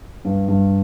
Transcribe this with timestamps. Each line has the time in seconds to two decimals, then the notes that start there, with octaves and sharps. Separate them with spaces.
0.25 G2
0.48 G2